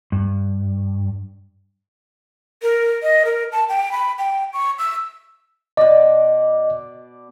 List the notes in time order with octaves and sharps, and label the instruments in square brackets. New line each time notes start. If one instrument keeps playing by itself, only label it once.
[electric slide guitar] G2
[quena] A#4
D#5
A#4
A5
G5
B5
G5
C#6
E6
[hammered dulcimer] B2 D5 [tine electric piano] D#5